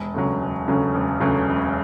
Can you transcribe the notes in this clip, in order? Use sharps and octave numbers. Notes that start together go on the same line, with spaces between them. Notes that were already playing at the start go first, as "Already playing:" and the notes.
Already playing: E1
D2 C#3 F#3
E1
D2 C#3 F#3
E1
D2 C#3 F#3
E1